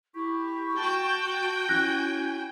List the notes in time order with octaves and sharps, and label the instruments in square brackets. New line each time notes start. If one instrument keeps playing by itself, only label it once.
[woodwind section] E4 G4 [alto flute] C#6
[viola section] F#4 G5 [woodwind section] A5
[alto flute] C#4 [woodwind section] E4 G#5 [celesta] F#6 A#6